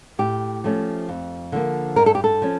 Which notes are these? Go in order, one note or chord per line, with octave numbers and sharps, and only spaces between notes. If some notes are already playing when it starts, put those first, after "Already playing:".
A2 G4
F3 A3 C#4
F2
D3 F3 A#3
G2 A#4
A4
G4
A4
F3 C#4